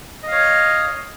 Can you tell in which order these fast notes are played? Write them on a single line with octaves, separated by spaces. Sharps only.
D#5 F5 C#5